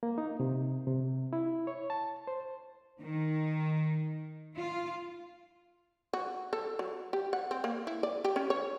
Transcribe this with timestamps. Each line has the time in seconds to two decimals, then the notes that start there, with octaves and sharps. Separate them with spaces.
0.03 A#3
0.18 D#4
0.40 C3
0.87 C3
1.33 E4
1.67 C#5
1.90 A5
2.27 C5
3.00 D#3
4.56 F4
6.13 F#4
6.53 A4
6.79 F#3
7.13 G4
7.33 F#5
7.51 C4
7.64 A#3
7.87 E4
8.03 D5
8.24 G4
8.36 C#4
8.50 C#5